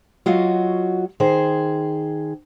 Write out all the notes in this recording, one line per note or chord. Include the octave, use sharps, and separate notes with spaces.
F#3 F4 F#4 D#5
D#3 G#4 C5